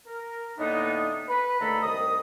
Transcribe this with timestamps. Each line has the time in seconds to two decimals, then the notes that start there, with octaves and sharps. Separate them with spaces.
0.06 A#4
0.59 A2 D3 A#3 B3 D4 D#4
1.28 B4
1.60 D#2 D3 A3 A4 A#5 B5
1.82 C2 D#3 D#5 D#6